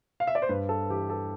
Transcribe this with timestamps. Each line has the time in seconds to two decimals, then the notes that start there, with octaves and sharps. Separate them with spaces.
0.20 F5
0.27 E5
0.35 D5
0.42 C5
0.49 G2 B4
0.69 A4
0.90 E3 G4
1.10 A4